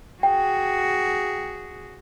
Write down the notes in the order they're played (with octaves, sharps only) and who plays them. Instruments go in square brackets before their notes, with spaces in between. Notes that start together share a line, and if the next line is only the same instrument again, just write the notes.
[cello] F#4 G#4 [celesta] G5